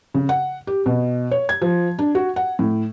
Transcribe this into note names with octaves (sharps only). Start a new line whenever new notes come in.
C#3
F#5
G4
B2
C#5
G#6
F3
D4
F#4
F#5
A2